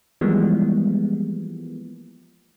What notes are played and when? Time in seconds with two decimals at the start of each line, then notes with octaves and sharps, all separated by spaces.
0.21 E3 F3 G3 G#3 A#3 B3